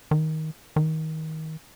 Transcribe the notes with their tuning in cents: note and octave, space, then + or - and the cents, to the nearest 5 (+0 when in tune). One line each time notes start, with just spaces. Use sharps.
D#3 +15
D#3 +25